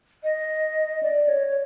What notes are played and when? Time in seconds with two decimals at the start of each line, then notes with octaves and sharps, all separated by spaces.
0.23 D#5
1.03 D5
1.28 C#5